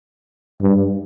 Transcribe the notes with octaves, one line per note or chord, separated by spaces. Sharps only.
G2